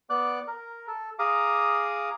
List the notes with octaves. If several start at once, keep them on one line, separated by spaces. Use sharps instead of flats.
B3 D5 D6 F#6
A#4
A4
G#4 F5 A#5 D6 D#6